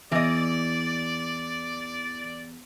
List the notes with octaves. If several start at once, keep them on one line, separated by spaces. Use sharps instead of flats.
E2 E3 D5 D#5